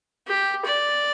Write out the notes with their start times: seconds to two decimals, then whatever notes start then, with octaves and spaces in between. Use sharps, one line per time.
0.27 G4
0.65 D5